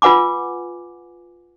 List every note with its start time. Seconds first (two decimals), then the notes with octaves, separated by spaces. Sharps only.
0.02 F4 B4 F#5 G#5 D6